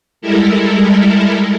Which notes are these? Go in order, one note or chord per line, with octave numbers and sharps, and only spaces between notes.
G3 G#3 E4 A4 A#4